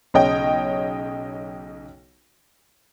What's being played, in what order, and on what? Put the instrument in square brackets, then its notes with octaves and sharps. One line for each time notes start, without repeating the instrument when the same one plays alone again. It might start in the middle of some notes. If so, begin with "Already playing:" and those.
[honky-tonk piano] B1 C#3 C#5 D#5 G5